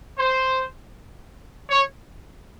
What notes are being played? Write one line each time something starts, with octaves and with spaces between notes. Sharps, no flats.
C5
C#5